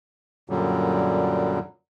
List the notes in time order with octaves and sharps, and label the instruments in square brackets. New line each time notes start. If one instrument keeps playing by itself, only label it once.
[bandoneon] F#2 A#2 D3 F#3 G3